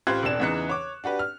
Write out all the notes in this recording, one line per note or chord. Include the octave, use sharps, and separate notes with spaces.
A1 F4 G4 C5 F#6 G#6
E1 C4 D4 E7
E2 C#3 E3 D#4 F#6 C#7
C#5 D6
D4 F#4 G4 B4
F6